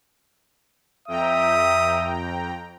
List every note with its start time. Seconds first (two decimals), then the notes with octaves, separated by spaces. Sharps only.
1.08 F2 E5 G5 A#5 D#6